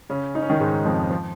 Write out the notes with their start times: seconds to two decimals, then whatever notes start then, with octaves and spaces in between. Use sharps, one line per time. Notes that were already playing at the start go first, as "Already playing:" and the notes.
0.10 C#3 C#4
0.35 D#4
0.42 C#4
0.50 D#3 D#4
0.60 G#2 G#3
0.85 F2 F3
1.11 F3